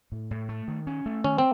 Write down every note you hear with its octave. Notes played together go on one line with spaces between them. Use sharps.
A2
A2
A3
D#3
C#4
A3
D#3 C#4
C4